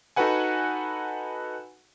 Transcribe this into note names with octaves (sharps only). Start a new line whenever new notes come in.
D#4 F#4 A4 B4 F#5 G#5